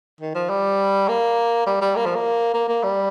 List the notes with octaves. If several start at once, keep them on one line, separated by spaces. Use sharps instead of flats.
D#3
F3
G3
A#3
G3
G3
A#3
F3
A#3
A#3
A#3
G3